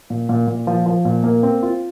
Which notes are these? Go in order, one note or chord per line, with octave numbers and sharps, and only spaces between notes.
A#2
A#2
A#2
F3
F3
A#2
A#3
C4
F4